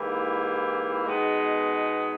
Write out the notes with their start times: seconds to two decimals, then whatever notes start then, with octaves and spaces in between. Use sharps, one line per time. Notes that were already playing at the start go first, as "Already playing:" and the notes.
Already playing: G#2 E3 A#3 E4 G4
1.06 B2 G#3 B3 D#4 G#4